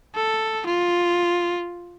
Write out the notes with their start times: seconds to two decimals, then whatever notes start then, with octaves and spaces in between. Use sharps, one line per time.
0.15 A4
0.66 F4